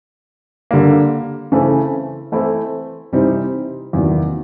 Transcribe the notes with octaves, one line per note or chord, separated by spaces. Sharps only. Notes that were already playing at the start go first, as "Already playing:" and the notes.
D3 G3 A#3
C#3 E3 A3 C4
E3 A3 C4 E4
C3 E3 G3 C4 D#4
E2 C3 D#3 F#3 A#3